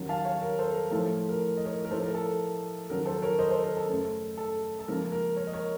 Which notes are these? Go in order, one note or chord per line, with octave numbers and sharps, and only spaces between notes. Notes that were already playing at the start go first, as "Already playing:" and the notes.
Already playing: D#2 C#3 F#3
F5 A5
C#5 F5
A#4
A4 C5
A#4
A2 F3 A3 A4
A#4
D#5
A#4 C#5
A#4
A2 F3 A3 A4 C5
A#4
A4
D#2 C#3 F#3 A#4
A4 C5
A#4 C#5
C5 D#5
A4 C5
A#4
A4
F#2 C#3 A3
A4
A4
C#2 C#3 F3 A#3 A#4
A#4
A#4 C#5
D#5
A#4 C#5